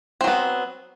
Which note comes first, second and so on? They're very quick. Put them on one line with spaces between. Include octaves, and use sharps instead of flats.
C4 F#3 B3